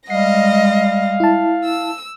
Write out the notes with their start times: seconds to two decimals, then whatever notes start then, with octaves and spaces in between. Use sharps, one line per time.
0.10 G3 G#3 D#5 F5 A#6 C7
1.20 E4 A5
1.65 E6